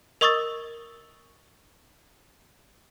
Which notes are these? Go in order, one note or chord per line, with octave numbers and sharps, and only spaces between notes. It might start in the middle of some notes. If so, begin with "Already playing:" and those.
A#4 D#5 C#6 D#6 E6 A6